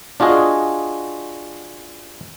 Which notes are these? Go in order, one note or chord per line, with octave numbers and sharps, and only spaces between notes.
D4 F4 F#4 G#4 D#5